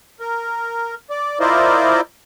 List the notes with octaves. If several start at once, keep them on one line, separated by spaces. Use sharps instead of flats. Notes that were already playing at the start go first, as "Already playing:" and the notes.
A#4
D5
E4 F4 A#4 C5 D5 D#5